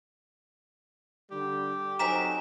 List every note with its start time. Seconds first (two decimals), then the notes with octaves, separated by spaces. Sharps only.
1.31 D3 G3 G4
1.99 F#3 C4 D#4 A4 A#4 G#5 B6 E7